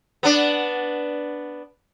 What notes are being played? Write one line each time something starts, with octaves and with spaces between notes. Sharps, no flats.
B3 D4